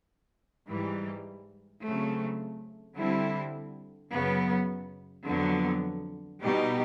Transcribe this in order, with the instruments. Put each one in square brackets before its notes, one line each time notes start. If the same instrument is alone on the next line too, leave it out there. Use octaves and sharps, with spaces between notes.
[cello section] G#2 E3 G3
C#3 F#3 A3 C4
D3 G3 C4 E4
F#2 C#3 F#3 B3
F2 D3 F#3 B3
B2 G3 B3 D#4 G4